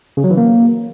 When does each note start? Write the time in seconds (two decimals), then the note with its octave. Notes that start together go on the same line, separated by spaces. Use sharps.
0.17 C#3
0.24 F#3
0.31 E3
0.37 A#3